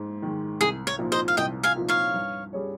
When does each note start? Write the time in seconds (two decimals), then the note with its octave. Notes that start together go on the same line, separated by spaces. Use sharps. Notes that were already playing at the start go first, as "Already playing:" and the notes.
Already playing: G#2 G#3
0.22 D#3 G#3
0.61 C2 G#4
0.87 C#5
0.99 A#2 F3 A#3 D#4
1.12 C5 D#5
1.28 F5
1.37 C2 D#5 G5
1.63 F5 G#5
1.76 A#2 F3 A#3 D#4
1.89 C#5 F5
2.14 G2
2.53 G3 C#4 G#4 C#5